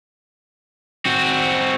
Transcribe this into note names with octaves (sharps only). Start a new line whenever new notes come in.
C4 F#4